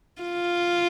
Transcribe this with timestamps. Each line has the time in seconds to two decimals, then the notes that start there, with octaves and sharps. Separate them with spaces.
0.22 F4